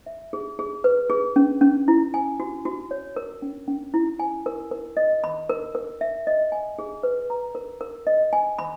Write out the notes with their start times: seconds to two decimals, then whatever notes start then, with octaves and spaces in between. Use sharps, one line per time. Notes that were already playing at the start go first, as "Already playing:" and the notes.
0.06 E5
0.33 G#4
0.59 G#4
0.84 B4
1.10 G#4
1.36 C#4
1.61 C#4
1.88 E4
2.14 G#5
2.40 F#4
2.65 F#4
2.91 C#5
3.16 A#4
3.42 C#4
3.68 C#4
3.94 E4
4.19 G#5
4.46 A#4
4.71 A#4
4.97 D#5
5.24 B5
5.49 A#4
5.75 A#4
6.01 E5
6.27 D#5
6.52 G#5
6.79 G#4
7.03 B4
7.30 A#5
7.55 A#4
7.81 A#4
8.07 D#5
8.33 G#5
8.59 B5